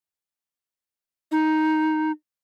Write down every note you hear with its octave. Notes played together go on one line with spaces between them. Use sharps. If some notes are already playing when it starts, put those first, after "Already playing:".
D#4